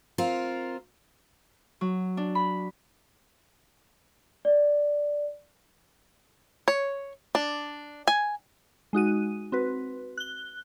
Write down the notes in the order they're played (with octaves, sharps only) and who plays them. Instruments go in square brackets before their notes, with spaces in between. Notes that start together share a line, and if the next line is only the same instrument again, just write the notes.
[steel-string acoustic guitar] C4 F4 A#4
[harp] F#3
D4
B5
[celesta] D5
[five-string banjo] C#5
D4
G#5
[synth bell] G#3 D#4 F#4 D#7
C4 F#4 B4
F#6 G7